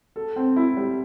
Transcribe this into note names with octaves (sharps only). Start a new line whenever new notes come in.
A4
C4
E4
G3